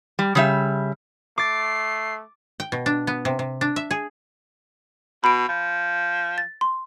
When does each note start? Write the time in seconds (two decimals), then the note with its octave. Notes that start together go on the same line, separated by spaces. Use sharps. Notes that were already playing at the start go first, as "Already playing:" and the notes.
0.19 G3
0.35 C#3 G3 E5
1.38 A3 D6 A6 C7
2.60 G5
2.72 B2
2.86 D4
3.07 B3
3.25 C3
3.39 C3
3.61 D4
3.76 E5
3.91 G#4
5.24 B2 B5 D7
5.49 F3
6.38 A6
6.61 C6